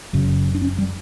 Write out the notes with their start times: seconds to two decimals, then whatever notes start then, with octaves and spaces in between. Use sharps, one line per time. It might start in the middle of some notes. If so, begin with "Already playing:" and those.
0.13 F#1 F#2 C#3
0.55 D4
0.62 C#4
0.78 G3